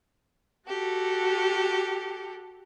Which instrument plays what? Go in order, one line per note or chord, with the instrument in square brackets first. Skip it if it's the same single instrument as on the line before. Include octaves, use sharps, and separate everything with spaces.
[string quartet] F#4 G4 A4